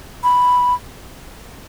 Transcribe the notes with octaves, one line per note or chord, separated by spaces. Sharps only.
B5